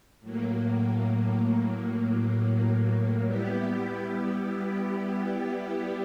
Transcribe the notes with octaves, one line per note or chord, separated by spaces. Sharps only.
A2 F#3 A#3
G3 B3 E4 G4